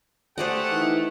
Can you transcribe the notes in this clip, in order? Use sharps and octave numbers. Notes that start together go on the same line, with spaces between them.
A3 G4 G#4 C5 D5 D#5 F#5
E3 D#4